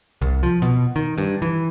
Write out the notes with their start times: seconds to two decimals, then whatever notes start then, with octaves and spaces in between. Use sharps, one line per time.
0.22 C2
0.43 F3
0.62 B2
0.96 D#3
1.18 G2
1.42 E3